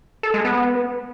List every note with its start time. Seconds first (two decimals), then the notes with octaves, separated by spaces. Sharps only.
0.23 A4
0.34 G#3
0.45 B3